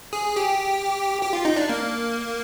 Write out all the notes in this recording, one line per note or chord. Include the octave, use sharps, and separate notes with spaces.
G#4
G4
G4
F4
D#4
D4
A#3